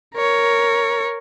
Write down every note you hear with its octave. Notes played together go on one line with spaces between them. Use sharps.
A#4 C#5